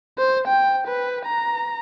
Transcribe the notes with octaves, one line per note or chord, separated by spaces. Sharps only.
C5
G5
B4
A#5